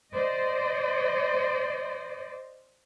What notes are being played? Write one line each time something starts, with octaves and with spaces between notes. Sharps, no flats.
C5 D5 D#5